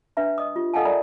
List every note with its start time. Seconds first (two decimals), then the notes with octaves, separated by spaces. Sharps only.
0.17 D4 B4 E5 A#5
0.38 D#5 D#6
0.56 F4 G4
0.73 A4 D#5 F5 F#5 G#5 A5
0.85 A#4 D5 E5 A#5 B5